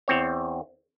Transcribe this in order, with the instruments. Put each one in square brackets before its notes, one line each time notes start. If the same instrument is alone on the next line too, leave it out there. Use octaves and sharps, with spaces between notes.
[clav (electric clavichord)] E2 C4 C#5